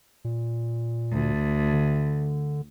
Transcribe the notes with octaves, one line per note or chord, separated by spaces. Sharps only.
A#2
D2
D3